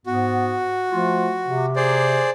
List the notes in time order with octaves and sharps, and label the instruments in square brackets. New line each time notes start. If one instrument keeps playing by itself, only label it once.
[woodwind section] G#2 B3 [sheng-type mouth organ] F#4
[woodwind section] F3 A3 F4
C3
[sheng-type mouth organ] G#4 C5 D5